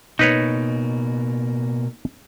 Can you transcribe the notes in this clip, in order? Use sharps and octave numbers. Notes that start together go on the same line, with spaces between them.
B2 A#3 D#4 B4 C#5